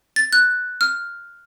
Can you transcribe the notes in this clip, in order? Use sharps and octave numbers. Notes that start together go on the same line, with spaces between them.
A6
F#6
F6